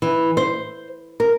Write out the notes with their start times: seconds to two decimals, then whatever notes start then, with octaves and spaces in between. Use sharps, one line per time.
0.02 E3
0.37 C5
1.20 A#4